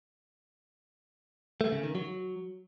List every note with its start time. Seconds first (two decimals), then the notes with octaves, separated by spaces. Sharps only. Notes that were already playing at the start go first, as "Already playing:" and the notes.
1.61 A3
1.72 C#3
1.83 D#3
1.95 F#3